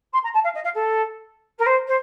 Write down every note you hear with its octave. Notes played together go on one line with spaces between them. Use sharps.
C6
A#5
A5
F5
D#5
F5
A4
A#4
C5
C5